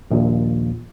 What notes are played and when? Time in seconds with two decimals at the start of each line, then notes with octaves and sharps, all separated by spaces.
0.11 A#1 D#2 A#2